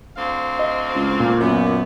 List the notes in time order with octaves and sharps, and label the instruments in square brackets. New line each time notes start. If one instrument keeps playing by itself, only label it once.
[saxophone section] D2 C4 F5
[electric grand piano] D#5
[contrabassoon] C#2
[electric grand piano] A#2
[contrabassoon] F#2 [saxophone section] B3